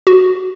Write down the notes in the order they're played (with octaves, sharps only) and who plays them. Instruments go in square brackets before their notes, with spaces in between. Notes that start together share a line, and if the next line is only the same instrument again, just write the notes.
[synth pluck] F#4